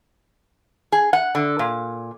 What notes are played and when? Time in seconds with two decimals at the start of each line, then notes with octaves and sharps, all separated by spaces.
0.92 G#4
1.13 F#5
1.35 D3
1.59 A#2